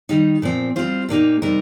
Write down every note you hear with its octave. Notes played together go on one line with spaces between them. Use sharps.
D#3 G3 D#4
A#2 F3 C4
G3 C4 F4 C5
A#2 A#3 D#4 G4
C3 G3 D#4 A#4